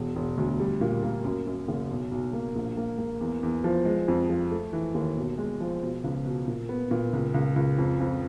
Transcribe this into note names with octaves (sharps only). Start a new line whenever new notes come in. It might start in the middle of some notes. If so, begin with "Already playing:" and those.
Already playing: E1
E1
D2
G3
A#2
A#3
F#2
F#2
F#1
B1
B1
A#3
A#1
A#3
A#3
E2
E2
F3
G#3
F2
F3
A3
E3
D#2
B1
G#3
F3
B2
C#2
B2
A#2
B3
A#2
C#2
C#2
C#2
F2
F2